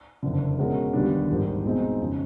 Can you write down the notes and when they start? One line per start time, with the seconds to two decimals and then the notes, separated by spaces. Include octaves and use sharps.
0.23 F#1 F2 D3
0.58 B2 G#3 C#4 F#4 A#4
0.93 D#2 D3 G3 B3 D4
1.29 A#1 G#2 D#3 G3
1.64 B2 G#3 C4 D#4
2.00 F2 C#3